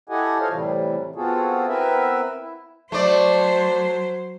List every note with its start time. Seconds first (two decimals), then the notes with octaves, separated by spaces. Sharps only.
0.09 E4 G4 A4 D#5 F#5 G#5
0.39 F4 A4 C5 C#5 D#5 F5
0.51 A2 C3 E3 G3
1.16 B3 C4 F4 F#4 G#4 A4
1.67 B3 C4 E4 A#4 B4 E5
2.39 E4
2.92 F#3 A3 C5 D5